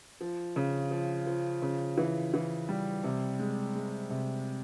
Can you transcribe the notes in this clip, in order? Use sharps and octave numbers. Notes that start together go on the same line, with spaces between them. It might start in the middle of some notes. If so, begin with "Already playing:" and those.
F3
C#3
F3
F3
C#3
E3
E3
G3
C3
G#3
G#3
C3